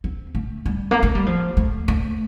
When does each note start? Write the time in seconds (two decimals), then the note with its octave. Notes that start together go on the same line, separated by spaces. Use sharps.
0.04 C4
0.35 A3
0.66 G3
0.91 A#3
1.03 A3
1.15 G3
1.26 F3
1.57 A3
1.88 A3